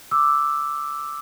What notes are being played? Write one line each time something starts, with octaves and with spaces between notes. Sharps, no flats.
D6 E6